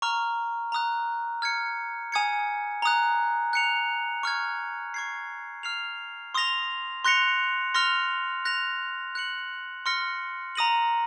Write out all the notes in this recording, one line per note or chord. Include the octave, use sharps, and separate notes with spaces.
A#5 C#6 F6
A#5 D#6 F#6
F6 G#6 C#7
G#5 D#6 G#6 C#7
A#5 D#6 F#6
F#6 C#7 F7
C#6 F6 G#6
C#6 G#6 C7
F6 C7 F7
C6 D#6 A#6 F7
C6 F#6 A#6 C#7 F7
C6 F6 A#6 F7
F#6 A#6 F7
F#6 C#7 F#7
C6 F6 A#6 C#7
A#5 D#6 A#6 D#7 F#7